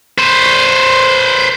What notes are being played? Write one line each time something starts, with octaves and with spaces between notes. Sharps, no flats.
B4 C5